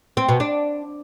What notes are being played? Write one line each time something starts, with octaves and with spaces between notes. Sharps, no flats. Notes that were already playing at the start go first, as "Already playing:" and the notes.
C4
B2
D4